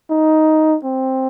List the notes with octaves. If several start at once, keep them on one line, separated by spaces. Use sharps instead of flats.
D#4
C4